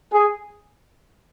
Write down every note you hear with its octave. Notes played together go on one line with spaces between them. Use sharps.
G#4